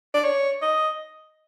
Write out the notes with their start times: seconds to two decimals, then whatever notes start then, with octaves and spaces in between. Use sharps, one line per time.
0.14 D5
0.25 C#5
0.62 D#5